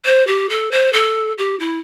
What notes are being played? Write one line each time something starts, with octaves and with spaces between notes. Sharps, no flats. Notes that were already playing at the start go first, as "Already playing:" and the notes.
C5
G4
A4
C5
A4
G4
E4